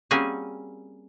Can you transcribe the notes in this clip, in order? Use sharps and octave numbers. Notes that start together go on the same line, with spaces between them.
G3 A#3 C4 C#4 F#4 G#4